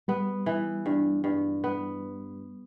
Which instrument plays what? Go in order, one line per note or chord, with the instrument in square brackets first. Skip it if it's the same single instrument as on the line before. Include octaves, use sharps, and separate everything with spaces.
[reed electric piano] G3 [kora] B3
[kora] E3
G2
G2
B3